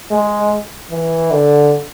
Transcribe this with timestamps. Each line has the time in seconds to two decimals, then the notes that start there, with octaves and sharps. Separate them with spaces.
0.11 G#3
0.91 E3
1.31 D3